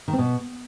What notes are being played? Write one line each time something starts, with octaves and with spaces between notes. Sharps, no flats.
D#3
C4
B2